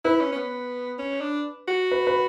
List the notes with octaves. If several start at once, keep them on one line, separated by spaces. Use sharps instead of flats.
E4 B4
C#4
C#4
B3
C#4
D4
F#4
B4
B4